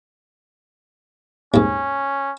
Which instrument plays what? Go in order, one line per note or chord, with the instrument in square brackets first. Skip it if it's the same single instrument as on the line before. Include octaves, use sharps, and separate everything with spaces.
[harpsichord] D#2 G#2 [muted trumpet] C#4